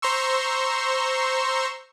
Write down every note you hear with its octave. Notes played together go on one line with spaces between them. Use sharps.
C5 A#5 C6 C#6 E6